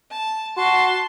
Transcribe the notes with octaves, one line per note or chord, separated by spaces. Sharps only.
A5
F#4 A5 C6